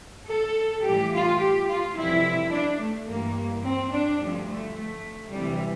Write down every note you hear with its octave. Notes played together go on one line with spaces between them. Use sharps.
A4
A2 E3 G3 G4
F4
G4
F4
F2 C3 E3 G3 E4
D4
A3
G2 E3 G3 A#3
C4
D4
D2 D3 F3 G3
A3
A3
D2 C3 E3 G3